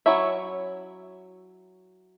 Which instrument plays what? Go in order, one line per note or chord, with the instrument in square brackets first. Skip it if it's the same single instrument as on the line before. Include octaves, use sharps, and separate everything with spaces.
[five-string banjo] F#3 C#4 E4 C#5 E5